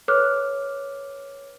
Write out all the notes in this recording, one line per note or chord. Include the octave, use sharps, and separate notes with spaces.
A4 B4 C#5 D6 F6 F#6